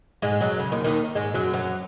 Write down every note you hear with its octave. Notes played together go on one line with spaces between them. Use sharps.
G#2 G#3
F#2 F#3
C#3
D#2 D#3
D#2 D#3
G#2 G#3
F#2 F#3
F#2 F#3